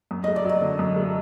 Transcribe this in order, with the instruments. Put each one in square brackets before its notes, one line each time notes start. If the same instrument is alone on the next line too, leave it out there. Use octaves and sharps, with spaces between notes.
[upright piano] F#2
[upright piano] A3 [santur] D#5
[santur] D5
[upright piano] F#3 [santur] D#5
[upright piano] D3
F#2
A3